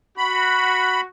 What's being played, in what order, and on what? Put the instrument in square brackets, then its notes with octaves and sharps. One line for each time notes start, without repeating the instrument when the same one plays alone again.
[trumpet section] F#4 [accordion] B5